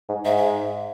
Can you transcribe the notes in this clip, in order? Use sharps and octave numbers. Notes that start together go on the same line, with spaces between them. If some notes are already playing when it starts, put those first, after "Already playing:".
G#2
G#2 E5
E5